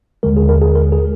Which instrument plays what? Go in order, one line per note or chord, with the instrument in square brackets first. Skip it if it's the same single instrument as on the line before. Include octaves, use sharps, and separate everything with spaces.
[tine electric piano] D#2 D3 G#3 A#4
G#4
A#4
G#4
A#4
G#4